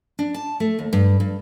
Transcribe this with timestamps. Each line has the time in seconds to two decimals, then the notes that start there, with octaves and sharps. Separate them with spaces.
0.19 D4
0.34 A5
0.60 A3
0.79 D#2
0.93 G2
1.20 G2